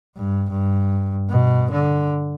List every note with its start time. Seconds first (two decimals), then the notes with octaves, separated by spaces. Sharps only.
0.17 G2
0.51 G2
1.30 B2
1.71 D3